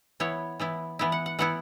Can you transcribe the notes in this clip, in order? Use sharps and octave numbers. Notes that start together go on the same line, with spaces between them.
E3 B3 E4 C#5
E3 B3 E4
E3 B3 E4
F#5
F#5
E3 B3 E4 F#5